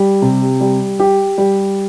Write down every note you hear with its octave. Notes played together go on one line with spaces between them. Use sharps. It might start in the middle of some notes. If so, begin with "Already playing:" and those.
Already playing: G3
C3
G3
G4
G3